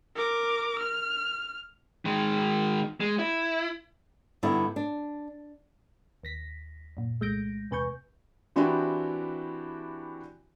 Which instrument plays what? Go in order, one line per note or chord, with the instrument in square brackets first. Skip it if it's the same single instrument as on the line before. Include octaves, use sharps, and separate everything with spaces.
[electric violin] A#4 D6
F6
[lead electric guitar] D#3 G#3
G#3
E4
[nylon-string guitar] G2 D3 B3 D#4 E4
D4
[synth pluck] D#2 A#6 B6
F#2 A#2
C2 G#3 A3 G6 A#6 D7
E2 C3 B4 G#5 C#6 G6
[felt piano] E3 C4 D4 E4 F#4 G4